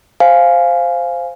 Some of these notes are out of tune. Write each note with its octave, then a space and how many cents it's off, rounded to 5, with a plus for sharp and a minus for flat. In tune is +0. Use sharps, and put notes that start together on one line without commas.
C5 +0 F5 +0 G#5 +0